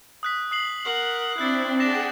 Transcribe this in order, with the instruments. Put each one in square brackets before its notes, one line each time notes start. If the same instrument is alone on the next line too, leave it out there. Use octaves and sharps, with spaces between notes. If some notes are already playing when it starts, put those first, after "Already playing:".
[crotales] D#6 F#6 B6
D#6 C7 F#7
[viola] A#4 F#5
[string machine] C4 [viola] D4 E4 [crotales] F#6 A6
[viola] D4 [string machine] G#4 F#5 G5 [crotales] A6 A#6 E7